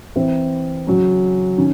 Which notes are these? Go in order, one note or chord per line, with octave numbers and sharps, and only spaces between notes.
E3 C4 E4
C#3 F#3 C#4
D#3 C#4